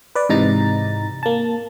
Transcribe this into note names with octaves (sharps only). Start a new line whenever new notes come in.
B4 D5
G#2 C3 E3 D#4 A#5 A6
A#3 A5